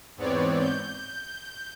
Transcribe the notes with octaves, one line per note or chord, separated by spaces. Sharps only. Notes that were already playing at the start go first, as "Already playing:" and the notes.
E2 G#2 B3 C4 C#5 D5
G6